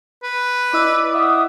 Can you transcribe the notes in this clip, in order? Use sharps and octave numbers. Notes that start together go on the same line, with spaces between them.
B4
E4 D5 D#5 E6
E5 F#5 D#6